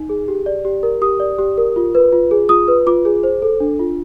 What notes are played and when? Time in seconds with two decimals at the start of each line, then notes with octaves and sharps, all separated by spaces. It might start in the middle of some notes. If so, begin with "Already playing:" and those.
Already playing: D#4
0.09 G#4
0.28 G4
0.46 D5
0.65 G4
0.83 A#4
1.02 G4 D#6
1.20 D5
1.39 G4
1.58 A#4
1.76 F4
1.95 B4
2.13 F4
2.31 G#4
2.49 F4 D#6
2.68 B4
2.86 F4 D6
3.05 G#4
3.23 C5
3.42 A4
3.60 D4
3.79 F4